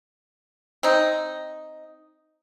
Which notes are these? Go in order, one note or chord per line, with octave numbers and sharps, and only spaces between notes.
C4 D#4